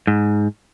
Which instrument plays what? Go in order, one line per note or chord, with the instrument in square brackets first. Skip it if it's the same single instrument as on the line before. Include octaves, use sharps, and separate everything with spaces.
[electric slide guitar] G#2